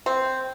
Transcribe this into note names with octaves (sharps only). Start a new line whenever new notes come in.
C4